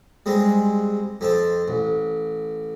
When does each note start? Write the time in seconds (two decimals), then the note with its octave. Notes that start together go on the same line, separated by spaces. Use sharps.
0.26 G3 G#3 C4
1.21 F2 C4 A5
1.68 A1